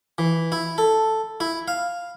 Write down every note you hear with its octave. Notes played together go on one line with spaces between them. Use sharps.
E3
E4
A4
E4
F5